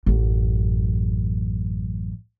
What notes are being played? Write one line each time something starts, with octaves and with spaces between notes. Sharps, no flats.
A1 F#2